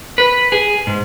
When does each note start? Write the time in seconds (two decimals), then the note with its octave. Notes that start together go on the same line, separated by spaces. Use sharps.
0.18 B4
0.52 G#4
0.87 G#2